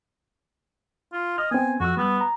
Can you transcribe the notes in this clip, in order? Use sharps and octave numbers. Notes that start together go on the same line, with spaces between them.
F4
D#5 F6
B3 C4 G#5
F2 F#4 C#6 E6
G3 B3 E6 F#6
A#5